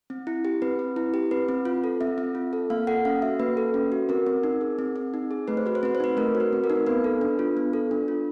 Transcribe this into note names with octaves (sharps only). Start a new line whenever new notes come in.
C4
E4
G4
C4 B4
C4
E4
G4
C4 B4
C4
F4
A4
C4 E5
C4
F4
A4
A#3 F5
A4 F#5
C#4 F5
F#4 E5
A#3 B4
A4
C#4
F#4
C4 A#4
C4
D#4
G#4
C4
C4
D#4
G#4
A3 B4
C5
F#4 B4
C5
C4 B4
C5
D#4 B4
A3 A#4
F#4
B4
C4
A#4
D#4
B3 B4
A4
D4
F4
B3
A4
D4
F4